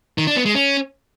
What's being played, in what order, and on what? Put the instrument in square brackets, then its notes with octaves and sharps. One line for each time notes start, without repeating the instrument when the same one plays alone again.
[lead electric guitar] D#3
D4
B3
G#3
C#4